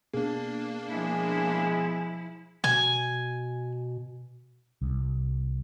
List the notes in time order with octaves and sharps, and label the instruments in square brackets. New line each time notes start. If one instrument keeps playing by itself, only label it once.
[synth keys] B2 B3 G#4 [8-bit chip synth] A#3 D4
[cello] F3 E4 [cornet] G#3
[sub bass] B2 [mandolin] G#5
[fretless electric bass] C2